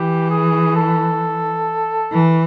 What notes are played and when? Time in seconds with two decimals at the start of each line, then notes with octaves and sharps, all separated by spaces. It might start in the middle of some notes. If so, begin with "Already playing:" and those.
Already playing: E3 G4
0.30 G#4
0.76 A4
2.12 E3